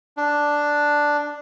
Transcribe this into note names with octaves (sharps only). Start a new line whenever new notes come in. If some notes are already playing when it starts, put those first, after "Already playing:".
D4